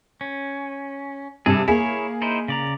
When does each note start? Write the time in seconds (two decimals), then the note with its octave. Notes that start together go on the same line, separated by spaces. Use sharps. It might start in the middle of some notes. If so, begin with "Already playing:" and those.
0.21 C#4
1.46 G2 C3 G#4 A4
1.68 A#3 E4 G#4 C#5
2.22 D#4 E4 C5
2.48 C#3 D5 A#5